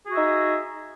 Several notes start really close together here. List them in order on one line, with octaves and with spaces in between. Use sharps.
G#4 F#4 E5 D#4